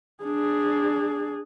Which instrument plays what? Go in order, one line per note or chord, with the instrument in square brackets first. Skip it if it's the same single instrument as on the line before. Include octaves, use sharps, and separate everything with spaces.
[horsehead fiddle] D4 G#4